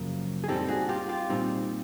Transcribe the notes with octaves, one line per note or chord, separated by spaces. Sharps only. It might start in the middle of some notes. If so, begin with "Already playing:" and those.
Already playing: F#2 C#3 F3 A#3
G#4
A#2 G3 C4 D#4 G4 A4
F#4 G#4
F4 G4
F4 G4
A#2 G3 C4 D#4